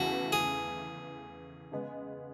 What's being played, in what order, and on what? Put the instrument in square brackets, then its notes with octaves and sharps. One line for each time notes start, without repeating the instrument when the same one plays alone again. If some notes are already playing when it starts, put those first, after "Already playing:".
Already playing: [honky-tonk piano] E2 C#3 E3 A3 [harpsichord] F#4
[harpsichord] G#4
[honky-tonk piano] C#3 G#3 B3